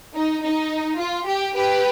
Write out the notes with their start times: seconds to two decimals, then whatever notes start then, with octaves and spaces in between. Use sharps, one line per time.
0.14 D#4
0.43 D#4
1.00 F4
1.27 G4
1.55 G4 B4